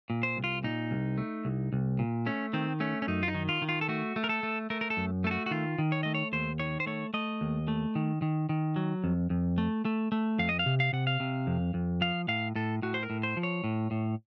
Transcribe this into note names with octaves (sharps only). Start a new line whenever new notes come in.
A#2
C5
C2
F4
A#2 D#4
C2
A3
C2
C2
A#2
A3 C#4
D#3 C4
A3 C#4
C#4
F#2 D#4
F4
D#4
D#3
F4
D#3
F4
A4
A3 F#4
A3
A#4
A4
A3
A3 A#4
A#4
A4
F#2
A3 A4
F#4
F#4
D#3 F4
D#3
C#5
A3 D#5
C#5
D#2 C5
D#3 C#5
C5
A3 C#5
A3 D#5
D#2
A3
D#3
D#3
D#3
F#3
F2
F2
A3
A3
A3
F2 F5
D#5
F5
C3
F5
C3 F#5
F5
C3
F2
F2
F3 F5
A2 F5
A2 A4
A2 F#4
C5
A#4
A2
C5
F3
C#5
A2
A2